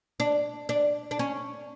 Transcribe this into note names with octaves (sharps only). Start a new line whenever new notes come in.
D4
D4
D4
C#4